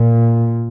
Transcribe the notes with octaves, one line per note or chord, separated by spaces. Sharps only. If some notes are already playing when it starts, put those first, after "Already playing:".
Already playing: A#2